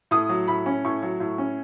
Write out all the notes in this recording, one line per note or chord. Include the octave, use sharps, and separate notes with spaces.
A2 D#6
F#3
A2 B5
C#4
A2 C#6
F#3
A2
C#4